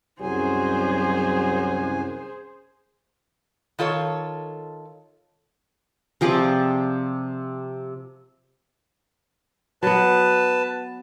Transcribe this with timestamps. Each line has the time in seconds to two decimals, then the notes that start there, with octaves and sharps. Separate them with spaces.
0.21 C2 F#2 F#3 G#4 C5 G#5
3.79 D#3 F4 A4 C#5
6.21 C3 F3 G#4 D5
9.83 F#3 B3 B4 A5